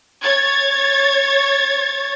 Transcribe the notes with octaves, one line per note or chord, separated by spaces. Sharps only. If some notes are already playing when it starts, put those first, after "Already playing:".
C#5 G#6 A6